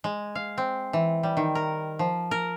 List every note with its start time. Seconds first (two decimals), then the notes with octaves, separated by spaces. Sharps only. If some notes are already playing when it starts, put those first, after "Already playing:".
0.04 G#3
0.35 F5
0.58 C4
0.93 E3
1.23 G3
1.37 D#3
1.55 A#4
1.99 F3
2.31 A#4